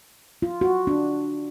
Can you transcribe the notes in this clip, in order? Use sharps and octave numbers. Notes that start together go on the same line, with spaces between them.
F4
F#4
D4